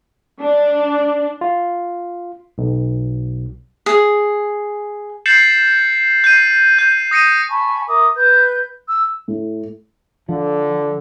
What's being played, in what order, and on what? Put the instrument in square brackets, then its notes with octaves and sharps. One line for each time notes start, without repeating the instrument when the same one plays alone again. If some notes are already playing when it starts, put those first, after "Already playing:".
[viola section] D4
[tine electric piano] F4
B1
[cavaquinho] G#4
[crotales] G6 A6 C7 C#7 E7 F#7
G6 C7 D#7
G6
D#6 A#6 C#7 D#7
[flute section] G#5 A5 B5 C#6
A#4 E5 D6 D#6
B4 G6
E6
[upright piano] A2
[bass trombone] D3 [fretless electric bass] F3